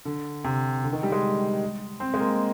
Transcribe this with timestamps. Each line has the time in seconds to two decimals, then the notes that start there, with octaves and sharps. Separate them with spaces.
0.05 D3
0.44 C3
0.83 D3
0.93 D#3
1.03 G3
1.12 G#3
2.00 C4
2.14 G#3
2.20 A#3